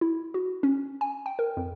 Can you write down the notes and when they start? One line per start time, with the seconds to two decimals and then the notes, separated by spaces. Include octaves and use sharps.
0.01 E4
0.34 F#4
0.63 C#4
1.01 G#5
1.26 G5
1.39 A#4
1.57 F2